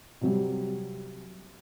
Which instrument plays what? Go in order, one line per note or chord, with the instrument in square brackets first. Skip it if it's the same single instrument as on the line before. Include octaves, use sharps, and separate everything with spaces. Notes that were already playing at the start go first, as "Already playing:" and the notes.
[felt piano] C3 F#3 G3